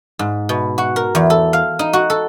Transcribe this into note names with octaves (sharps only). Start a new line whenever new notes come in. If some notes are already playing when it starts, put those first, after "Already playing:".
G#2
B2
F#4
A#4
E2
A4
F5
D#4
F#4
A4